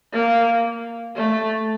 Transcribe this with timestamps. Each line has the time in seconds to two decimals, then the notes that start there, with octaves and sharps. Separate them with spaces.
0.13 A#3
1.16 A3